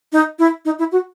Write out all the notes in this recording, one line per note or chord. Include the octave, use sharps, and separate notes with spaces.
D#4
E4
D#4
E4
F#4